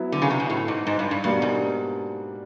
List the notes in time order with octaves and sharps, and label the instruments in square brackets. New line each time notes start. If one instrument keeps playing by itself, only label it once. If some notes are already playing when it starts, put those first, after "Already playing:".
Already playing: [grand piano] F#3 B3 E4
[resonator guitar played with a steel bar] D3
C#3
C3
B2
A2
G#2
G#2
G2
G2
[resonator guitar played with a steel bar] G2 [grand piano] B2 G3 A#3 D4
[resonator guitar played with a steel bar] G#2